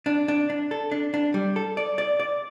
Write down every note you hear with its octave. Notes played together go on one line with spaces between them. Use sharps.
D4
D4
D4
A4
D4
D4
G3
A4
D5
D5
D5